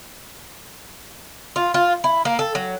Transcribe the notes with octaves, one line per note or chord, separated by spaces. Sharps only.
F4
F4
E4
A#3
A4
F#3